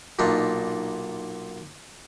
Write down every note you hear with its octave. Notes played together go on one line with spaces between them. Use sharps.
B1 A#2 D4 D#4